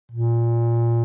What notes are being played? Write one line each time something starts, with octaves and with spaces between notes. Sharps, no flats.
A#2